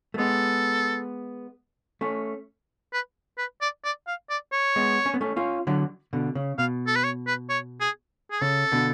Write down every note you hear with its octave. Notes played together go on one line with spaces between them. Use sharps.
A3
G#3 B3 A4
A3 C#4
B4
B4
D5
D5
F5
D5
C#5
G#3 B3
C#4
B3
A3 C#4
C#4 F4
D3 F#3
B2 D3
C#3
B2 F5
A4
B4
C#5
B4
C#5
G#4
G#4
C#3 A4
B2 D3